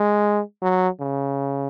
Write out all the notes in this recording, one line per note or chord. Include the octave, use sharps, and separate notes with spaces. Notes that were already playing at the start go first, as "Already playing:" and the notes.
Already playing: G#3
F#3
C#3